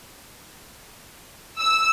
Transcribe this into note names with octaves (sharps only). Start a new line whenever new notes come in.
E6